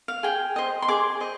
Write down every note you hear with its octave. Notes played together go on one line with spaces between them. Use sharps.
F5
G#4 G5
C5 D#5
C6
G#4 D6
C5 D#5